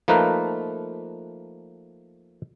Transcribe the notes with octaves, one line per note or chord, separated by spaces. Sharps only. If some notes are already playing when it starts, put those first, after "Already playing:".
F3 A3 A#3 D#4 A#4 B4